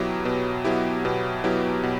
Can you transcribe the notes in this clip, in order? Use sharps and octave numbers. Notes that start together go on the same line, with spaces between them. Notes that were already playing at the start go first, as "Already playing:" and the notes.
Already playing: B2 F#3 B3 E4 G4
B2
F#3 B3 E4 G4
B2
F#3 B3 E4 G4
B2